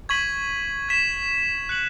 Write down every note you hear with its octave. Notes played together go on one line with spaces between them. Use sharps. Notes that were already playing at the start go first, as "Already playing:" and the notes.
C#6 G#6 B6 D#7 F#7
G#6 B6 E7
F#6 C#7 F#7